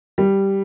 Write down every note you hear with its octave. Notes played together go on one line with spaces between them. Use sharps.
G3